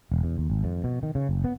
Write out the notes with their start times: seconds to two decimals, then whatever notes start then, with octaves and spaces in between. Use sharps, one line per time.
0.12 E1
0.24 E2
0.38 D#2
0.50 G#1
0.64 F2
0.84 B2
1.03 D#3
1.15 C#3
1.29 F#1
1.44 B3